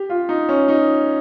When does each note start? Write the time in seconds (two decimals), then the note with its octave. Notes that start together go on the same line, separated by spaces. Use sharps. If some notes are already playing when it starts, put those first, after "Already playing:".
Already playing: G4
0.10 F4
0.29 D#4
0.49 C#4
0.68 D#4